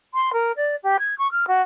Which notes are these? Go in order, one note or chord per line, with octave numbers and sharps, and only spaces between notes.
C6
A#4
D5
G4
G#6
C#6
F6
F#4